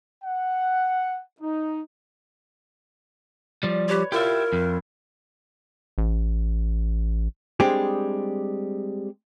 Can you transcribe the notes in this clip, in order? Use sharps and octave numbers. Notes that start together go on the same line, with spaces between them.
F#5
D#4
F3 G3 D5
G4 B4 C#5
E4 F4 G4 A#4 E5
F2
A1
G3 G#3 C4 D4 G4 G#4